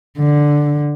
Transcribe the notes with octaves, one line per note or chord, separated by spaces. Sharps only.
D3